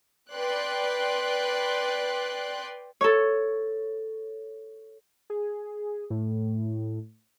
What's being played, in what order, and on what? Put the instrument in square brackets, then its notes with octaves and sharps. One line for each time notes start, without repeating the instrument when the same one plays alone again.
[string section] B4 D5 G5 C6 F#6
[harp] A4 C#5
[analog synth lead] G#4
A2